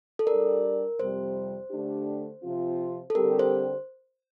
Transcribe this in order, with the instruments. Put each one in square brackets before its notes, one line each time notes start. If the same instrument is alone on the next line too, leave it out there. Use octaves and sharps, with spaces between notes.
[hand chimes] A4
[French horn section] G3 D4 G4 D5 [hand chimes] A#4
[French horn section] F2 C3 G3 [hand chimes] C5
[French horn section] D3 A3 D4 G4
C3 F3 C4 F4
[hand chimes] A4
[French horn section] D3 G3 C4 G4 [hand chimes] A#4
[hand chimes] C5